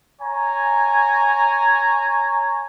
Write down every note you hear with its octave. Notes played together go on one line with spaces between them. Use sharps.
C#5 G#5 A#5